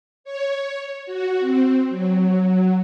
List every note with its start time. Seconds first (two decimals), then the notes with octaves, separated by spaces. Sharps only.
0.24 C#5
1.06 F#4
1.40 C4
1.89 F#3